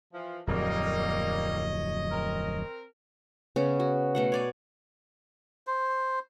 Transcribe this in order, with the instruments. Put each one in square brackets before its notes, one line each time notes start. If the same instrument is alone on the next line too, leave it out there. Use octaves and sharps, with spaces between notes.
[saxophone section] E3 F3
[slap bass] D1 F2 F#3 [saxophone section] G3 A#3 [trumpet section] C#5 D#5
[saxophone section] C4 A#4
[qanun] C#3 B3 C#4
F#4
B2 A3 F#5
C#5 D5 G#5
[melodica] C5